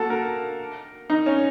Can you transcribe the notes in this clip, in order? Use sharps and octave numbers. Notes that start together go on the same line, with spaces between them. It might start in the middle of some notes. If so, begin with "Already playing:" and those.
Already playing: A#3 F#4 A4
A#4
D#4
C#4